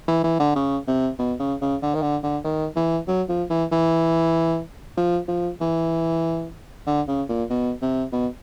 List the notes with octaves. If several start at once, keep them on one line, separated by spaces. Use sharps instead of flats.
E3
E3
D3
C#3
C3
B2
C#3
C#3
D3
D#3
D3
D3
D#3
E3
F#3
F3
E3
E3
F3
F3
E3
D3
C#3
A#2
B2
C3
B2